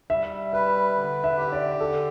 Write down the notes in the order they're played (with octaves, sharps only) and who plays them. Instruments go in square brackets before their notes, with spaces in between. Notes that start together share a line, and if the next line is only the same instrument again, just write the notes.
[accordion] G3 [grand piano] E5
[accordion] B4 [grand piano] E5
[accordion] D3
[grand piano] E5
[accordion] G4
[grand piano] D5
[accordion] D3 [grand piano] A4